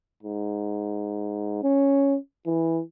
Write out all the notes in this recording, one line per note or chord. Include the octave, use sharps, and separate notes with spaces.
G#2
C#4
E3